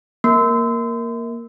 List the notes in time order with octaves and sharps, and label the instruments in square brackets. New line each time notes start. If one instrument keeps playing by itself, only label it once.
[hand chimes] A#3